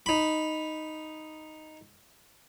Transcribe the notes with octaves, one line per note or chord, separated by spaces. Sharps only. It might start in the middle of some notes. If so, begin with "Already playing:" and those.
D#4 B5